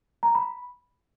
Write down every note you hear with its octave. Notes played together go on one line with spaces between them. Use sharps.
A#5
B5